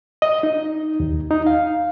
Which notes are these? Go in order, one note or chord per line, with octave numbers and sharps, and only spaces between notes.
D#5
D#4
D#2
D#4
F5